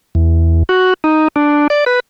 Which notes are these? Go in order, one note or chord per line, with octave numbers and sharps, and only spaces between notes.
E2
F#4
D#4
D4
D5
B4